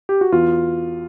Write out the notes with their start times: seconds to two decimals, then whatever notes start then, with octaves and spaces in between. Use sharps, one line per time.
0.09 G4
0.21 F#4
0.32 E2 F4